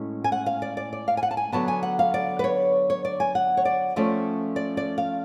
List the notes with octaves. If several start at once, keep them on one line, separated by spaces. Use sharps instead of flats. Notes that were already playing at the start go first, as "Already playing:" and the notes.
Already playing: A2 G#3 C#4
G#5
F#5
F5
D5
D5
D5
F5
G#5
F#5
A5
G#5
D3 F#3 B3 A5
G#5
F#5
F5
D5
B4
C#5
C#5
D5
G#5
F#5
C#5
D5
F3 A3 C#4 D5
D5
D5
F5